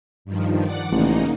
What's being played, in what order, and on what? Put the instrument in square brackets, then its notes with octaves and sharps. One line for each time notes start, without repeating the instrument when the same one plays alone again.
[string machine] G2 D#3 F3
D5 F#5
[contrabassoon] A1 [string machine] C#3 A#3 D#4